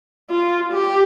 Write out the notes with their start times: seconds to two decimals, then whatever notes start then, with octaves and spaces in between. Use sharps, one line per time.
0.30 F4
0.72 G4